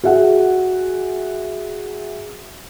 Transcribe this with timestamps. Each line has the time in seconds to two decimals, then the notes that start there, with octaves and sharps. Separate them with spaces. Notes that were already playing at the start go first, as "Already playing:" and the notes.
0.04 F#4 G#4 E5 F#5